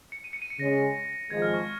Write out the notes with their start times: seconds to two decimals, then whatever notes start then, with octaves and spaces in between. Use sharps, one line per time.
0.12 C#7
0.24 D#7
0.33 C#7
0.42 D#7
0.50 C#7
0.59 C#3 G#3 C#4 A#6
1.30 G#1 G#2 F3 G#3 G#6
1.42 F6
1.54 C#6